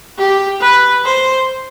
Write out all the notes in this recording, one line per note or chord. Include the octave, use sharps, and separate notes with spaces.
G4
B4
C5